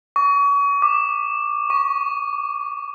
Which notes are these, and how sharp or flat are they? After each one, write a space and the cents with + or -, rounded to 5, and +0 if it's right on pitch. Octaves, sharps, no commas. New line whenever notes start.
C#6 +35
D6 +20
C#6 +5